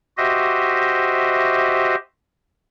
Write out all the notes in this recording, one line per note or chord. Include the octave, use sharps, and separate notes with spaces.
F#4 G4 C5 D#5 E5